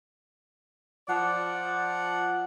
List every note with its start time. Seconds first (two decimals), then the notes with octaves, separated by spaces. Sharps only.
1.08 F3 D5 F#5